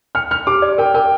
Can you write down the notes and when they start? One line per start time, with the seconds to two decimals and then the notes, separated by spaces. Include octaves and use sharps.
0.15 G5 F6
0.31 G5 F6
0.47 G4 D6
0.62 D5
0.78 A#4 G5
0.94 A#4 G5